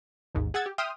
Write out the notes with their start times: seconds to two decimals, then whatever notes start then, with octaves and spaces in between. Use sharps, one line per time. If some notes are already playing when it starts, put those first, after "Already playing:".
0.35 A1 D#2 G#2
0.54 G#4 F#5 E6 G#6 A6
0.66 G4
0.78 E5 G5 C6 D#6 F6